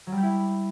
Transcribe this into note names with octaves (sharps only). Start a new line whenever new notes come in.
F#3
G3
G4
E4